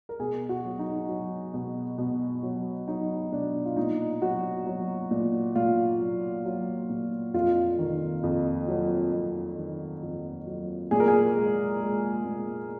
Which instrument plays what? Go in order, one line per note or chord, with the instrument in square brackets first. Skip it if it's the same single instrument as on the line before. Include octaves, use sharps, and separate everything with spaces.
[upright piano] A#4
B2 G#4
F#4
F#3
D#4
F#3
B2
B2
F#3
F#3 D#4
B2 D4
F4
A#2 D#4
F#3 F#4
F#3
A#2
A#2 F4
F#3
F#3
A#2
F2 F4
D#3
F2
F#3
F2
D#3
F2
F#3
A#2 G#4
A#4
G#4
G#3
G#3
A#2